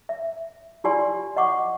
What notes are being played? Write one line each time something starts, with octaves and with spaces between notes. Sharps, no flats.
E5
E4 F4 G4 D5 G#5 C6
D#5 F#5 C#6 D6